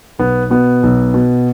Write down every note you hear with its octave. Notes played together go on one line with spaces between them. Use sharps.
B1 B3
B2 B3
B1
B2